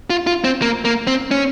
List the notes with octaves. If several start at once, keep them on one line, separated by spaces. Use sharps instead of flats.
F4
F4
C4
A#3
A#3
C4
C#4